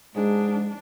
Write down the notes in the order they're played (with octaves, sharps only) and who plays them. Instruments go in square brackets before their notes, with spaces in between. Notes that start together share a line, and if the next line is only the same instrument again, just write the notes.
[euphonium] G#2 [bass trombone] G#3 [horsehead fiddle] D4 [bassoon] G#4